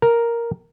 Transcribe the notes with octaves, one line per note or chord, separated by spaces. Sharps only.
A#4